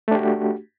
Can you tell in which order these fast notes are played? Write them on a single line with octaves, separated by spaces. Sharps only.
A3 D4 G4 F#4